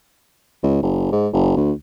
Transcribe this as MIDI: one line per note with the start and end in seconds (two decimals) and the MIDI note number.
0.63 0.80 37
0.82 1.07 30
1.12 1.28 44
1.33 1.54 30
1.57 1.72 38